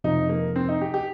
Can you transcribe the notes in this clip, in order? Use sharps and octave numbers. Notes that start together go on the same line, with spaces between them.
F2 C3 F3 D#4
A#3
C4
D#4
G4
G4